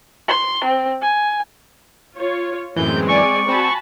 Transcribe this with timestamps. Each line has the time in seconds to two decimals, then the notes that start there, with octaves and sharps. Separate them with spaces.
0.29 C6
0.64 C4
1.02 G#5
2.17 F4 C#5
2.77 F#2 A2 E3 G#3 C4 G6
3.08 D5 G#5 C#6
3.49 C4 F#4 G#5 A5 B5